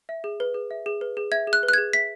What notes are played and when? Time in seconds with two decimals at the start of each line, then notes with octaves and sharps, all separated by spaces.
0.09 E5
0.24 G#4
0.40 B4
0.54 G#4
0.71 E5
0.86 G#4
1.01 B4
1.17 G#4
1.32 E5 G#6
1.47 G#4
1.53 F#6
1.63 B4
1.69 F#6
1.73 G#4 G#6
1.93 E5 B6